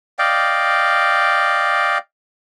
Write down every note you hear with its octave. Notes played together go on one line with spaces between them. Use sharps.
D5 D#5 F5 G5